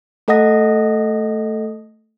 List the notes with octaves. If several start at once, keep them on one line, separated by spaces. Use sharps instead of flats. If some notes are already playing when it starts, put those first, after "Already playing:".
A3 A4 D#5 F#5 D#6 A#6